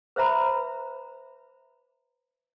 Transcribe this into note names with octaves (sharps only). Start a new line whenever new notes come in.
B4 C5 E5 A#5 B5